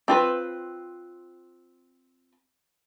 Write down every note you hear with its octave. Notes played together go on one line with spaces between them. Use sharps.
C4 F4 B4